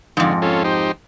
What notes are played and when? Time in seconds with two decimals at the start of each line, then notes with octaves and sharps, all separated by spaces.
0.17 F2 G#2 D3
0.42 C#4 F4 A4
0.64 D#4 G4 C5